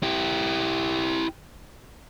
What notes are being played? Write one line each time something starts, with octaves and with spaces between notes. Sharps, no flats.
E4 G4